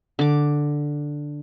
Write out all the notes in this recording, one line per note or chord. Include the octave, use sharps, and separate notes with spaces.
D3 D6